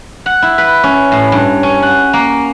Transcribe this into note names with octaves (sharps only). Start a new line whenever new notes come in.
F#5
E4
B4
C#4
A2
G2
C#4
F#5
A#3